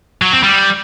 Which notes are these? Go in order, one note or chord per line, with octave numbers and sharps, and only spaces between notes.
F#3
C4
G3